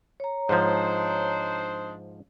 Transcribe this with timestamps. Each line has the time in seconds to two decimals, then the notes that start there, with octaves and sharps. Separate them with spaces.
0.20 C#5 A#5
0.49 G#2 F3 D4 D#4 C5